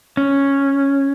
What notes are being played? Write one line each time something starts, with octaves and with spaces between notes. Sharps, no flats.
C#4